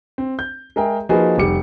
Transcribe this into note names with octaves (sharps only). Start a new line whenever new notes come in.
C4
G6
G#3 G#4 A#4 E5 G5
F3 A#3 D#4 F#4 G#4 B4
F1 G3 D6 C#7